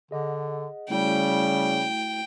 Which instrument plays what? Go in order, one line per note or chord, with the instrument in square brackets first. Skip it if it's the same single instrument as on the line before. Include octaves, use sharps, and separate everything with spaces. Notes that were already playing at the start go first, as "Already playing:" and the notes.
[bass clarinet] D3 [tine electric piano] G#4 D#5 F#5
[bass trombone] C#3 [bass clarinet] G3 [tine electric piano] A3 E4 F#4 [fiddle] G5